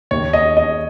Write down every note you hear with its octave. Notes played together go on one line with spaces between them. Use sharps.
D#2 D#3 C#5
D#5
D#5